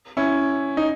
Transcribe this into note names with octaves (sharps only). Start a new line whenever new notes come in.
C#4 E4
D#4